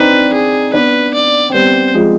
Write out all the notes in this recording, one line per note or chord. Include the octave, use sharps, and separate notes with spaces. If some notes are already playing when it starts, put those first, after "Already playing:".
Already playing: C4 D4 D#4 B4
G#4
B3 D4 B4
D5
C4
G3 B3 C5
F3 G#3